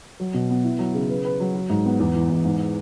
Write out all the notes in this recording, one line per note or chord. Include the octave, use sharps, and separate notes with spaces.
F#3
B2
B3
E4
F#3
C#3
B4
B4
F#3
F#4
G#2
B3
E2
E3
E2
G#2